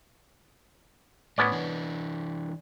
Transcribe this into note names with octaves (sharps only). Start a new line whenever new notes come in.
A2 B3 C#4 D5
E3 D4